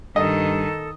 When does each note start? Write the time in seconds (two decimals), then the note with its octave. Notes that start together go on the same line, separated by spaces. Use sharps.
0.16 G2 D#3 A4 D#5